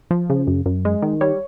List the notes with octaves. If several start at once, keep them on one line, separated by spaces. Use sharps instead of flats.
F3
C#3
F#2
F#2
G#3
D#3
G3 C#5